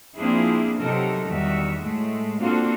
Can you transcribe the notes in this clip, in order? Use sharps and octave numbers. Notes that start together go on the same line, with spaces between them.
F3 A#3 C4 D4 E4 G#4
C3 F#3 D#4 A4 A#4
E2 D#3 G3 F#4 E5
A2 G#3 A3
A#3 C4 D4 F4 F#4 A4